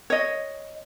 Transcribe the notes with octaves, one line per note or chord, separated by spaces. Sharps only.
C#5 D#5